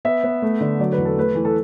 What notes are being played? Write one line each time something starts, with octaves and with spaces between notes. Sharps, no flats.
B3 E5
B3
A3
D3
F#3 D5
B4
E2
A4
A3 B4
E3
A4